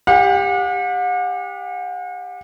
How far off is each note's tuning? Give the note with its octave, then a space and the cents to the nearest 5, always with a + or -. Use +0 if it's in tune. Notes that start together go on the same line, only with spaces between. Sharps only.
G4 +20 F#5 -40